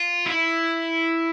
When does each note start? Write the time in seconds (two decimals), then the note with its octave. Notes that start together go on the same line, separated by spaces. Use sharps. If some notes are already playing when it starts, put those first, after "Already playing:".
Already playing: F4
0.26 E4